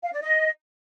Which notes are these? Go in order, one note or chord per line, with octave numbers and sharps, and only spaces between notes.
F5
D5
D#5